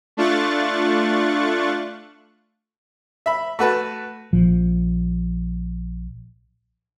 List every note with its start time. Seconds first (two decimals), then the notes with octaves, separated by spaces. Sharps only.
0.17 A3 D4 F4 C#6 F#6 A6
3.26 E5 B5
3.59 A3 F#4 B4 A5
4.33 A#1 F3